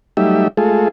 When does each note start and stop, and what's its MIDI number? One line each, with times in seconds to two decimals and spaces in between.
0.17 0.48 54
0.17 0.48 55
0.17 0.48 57
0.17 0.48 63
0.17 0.48 67
0.17 0.48 76
0.57 0.88 56
0.57 0.88 57
0.57 0.88 65
0.57 0.88 68
0.57 0.88 69